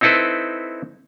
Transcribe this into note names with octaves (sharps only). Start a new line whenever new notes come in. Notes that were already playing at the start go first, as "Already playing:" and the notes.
C4 D#4 E4 A4 B4 C5